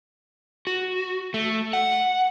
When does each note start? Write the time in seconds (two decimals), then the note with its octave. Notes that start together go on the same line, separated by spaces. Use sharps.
0.67 F#4
1.34 A3
1.73 F#5